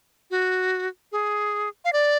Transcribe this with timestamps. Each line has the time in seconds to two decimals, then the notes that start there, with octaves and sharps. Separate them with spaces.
0.31 F#4
1.12 G#4
1.85 F5
1.93 D5